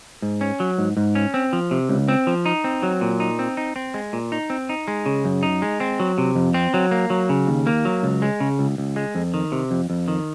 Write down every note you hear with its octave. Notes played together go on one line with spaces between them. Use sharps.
G#2
C#4
F#3
G#2
G#2
C#4
C4
F3
C3
C#2
C4
F3
D#4
C4
F#3
A#2
D#4
C4
D#4
C4
G#3
A#2
D#4
C4
D#4
G#3
C#3
F#2
D#4
G#3
C4
F#3
C3
F2
C4
F#3
A#3
F#3
C#3
D#2
A#3
F#3
C#2
G#3
C#3
C#2
C#2
G#3
F2
D#3
C3
F2
F2
D#3